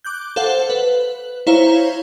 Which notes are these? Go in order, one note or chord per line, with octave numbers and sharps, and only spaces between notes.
D6 F#6 G6
A4 C5 F5 F#5
B4
E4 C5 C#5 F5 A#5